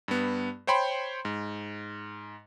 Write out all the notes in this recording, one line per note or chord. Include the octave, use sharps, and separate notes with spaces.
G2 B3
C5 C#5 G5 B5 C6
G#2